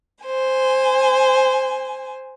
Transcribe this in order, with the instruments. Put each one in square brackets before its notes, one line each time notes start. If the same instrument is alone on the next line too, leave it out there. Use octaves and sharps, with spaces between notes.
[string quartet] C5 G#5